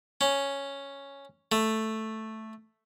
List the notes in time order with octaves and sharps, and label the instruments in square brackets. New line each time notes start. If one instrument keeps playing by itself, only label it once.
[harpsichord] C#4
A3